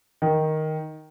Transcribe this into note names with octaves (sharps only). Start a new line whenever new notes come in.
D#3